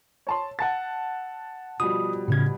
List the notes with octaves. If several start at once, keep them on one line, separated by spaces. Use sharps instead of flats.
C#5 A5 C6
F#5 A5 A6
B2 F3 G3 D#6
A2 C#3 G#6